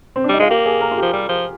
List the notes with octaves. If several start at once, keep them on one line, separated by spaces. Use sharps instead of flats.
C4
D4
G3 D#4
G#3 F4
A#3 G4
G#4
A#4
F4
F3 G4
G3
F3